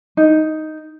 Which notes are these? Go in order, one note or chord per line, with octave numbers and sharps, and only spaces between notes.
D#4